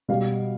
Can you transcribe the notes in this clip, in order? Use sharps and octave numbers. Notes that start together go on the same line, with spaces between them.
B2 G3 B3 F5